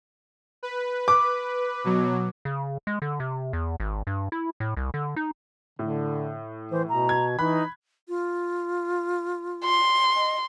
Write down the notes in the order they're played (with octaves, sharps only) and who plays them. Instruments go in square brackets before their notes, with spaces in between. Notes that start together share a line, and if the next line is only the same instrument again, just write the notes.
[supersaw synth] B4
[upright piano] D6
[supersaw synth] B2 F#3
[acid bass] C#3
G#3
D3
C3
E2
G#1
G2
E4
A2
C2
D3
D#4
[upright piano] A2 [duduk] D3
[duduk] E3 [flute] C5
[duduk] B2 [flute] A#5
[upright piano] G#6
[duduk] E3 [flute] D#4 [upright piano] B5 F#6
[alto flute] F4
[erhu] C6
[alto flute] D#5